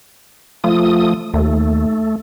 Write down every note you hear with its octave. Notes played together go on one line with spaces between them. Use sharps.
F3 A3 F4 D#6
D#2 A3